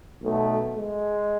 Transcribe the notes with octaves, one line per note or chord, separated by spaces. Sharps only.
B1 B2 A3
G#3